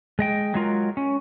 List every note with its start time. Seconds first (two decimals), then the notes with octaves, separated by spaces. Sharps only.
0.19 G#3 D#5 G5
0.54 F#3 G#3 F4 A#4
0.97 C#4